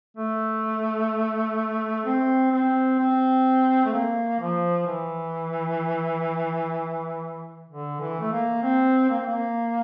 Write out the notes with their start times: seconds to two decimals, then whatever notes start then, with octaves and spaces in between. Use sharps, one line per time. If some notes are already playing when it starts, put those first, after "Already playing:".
0.17 A3
2.05 C4
2.52 C4
2.99 C4
3.86 A3
3.92 A#3
4.40 F3
4.86 E3
7.69 D3
8.00 E3
8.20 A3
8.32 A#3
8.63 C4
9.10 A#3
9.18 C4
9.26 A#3